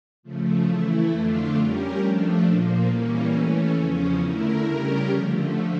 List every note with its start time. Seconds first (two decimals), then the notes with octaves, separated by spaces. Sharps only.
0.23 C#3 F3 A3
0.67 E3 A3 E4
1.11 F2 D3 A3 D4 F4
1.55 G3 C#4 G4 A#4
1.99 F3 A3 D4
2.43 A#2 F3 A#3
2.86 E3 G3 A#3 C#4
3.31 E3 A3 C#4
3.75 E2 C#3 F3 C#4
4.19 D3 A3 E4 A#4
4.62 C#3 G3 C#4 G4 A#4
5.07 D3 F3 A3